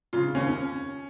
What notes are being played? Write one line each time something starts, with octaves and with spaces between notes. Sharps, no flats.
C#3 F4
D#2 C#4